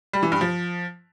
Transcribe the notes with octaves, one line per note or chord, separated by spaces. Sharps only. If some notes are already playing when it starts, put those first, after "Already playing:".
G3
E3
G2
F3